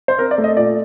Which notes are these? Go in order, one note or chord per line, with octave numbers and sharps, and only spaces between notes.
C5
C4 A#4
D5
A3
D#5
A#2 D5